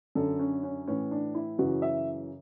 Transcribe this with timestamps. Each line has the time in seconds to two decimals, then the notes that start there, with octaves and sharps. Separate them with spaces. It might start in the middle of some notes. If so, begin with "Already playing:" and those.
0.15 F#2 D3 A4
0.39 C#4
0.63 C#4
0.87 A2 E3 C#4
1.11 D4
1.35 E4
1.59 F#2 C#3 E3 F#4
1.82 E5